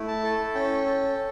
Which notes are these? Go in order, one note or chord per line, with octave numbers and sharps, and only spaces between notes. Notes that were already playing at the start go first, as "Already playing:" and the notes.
Already playing: A3 E4
A5
A4
C#4 G5
A4